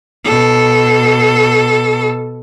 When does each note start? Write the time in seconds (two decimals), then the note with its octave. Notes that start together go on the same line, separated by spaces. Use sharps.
0.25 B2 A4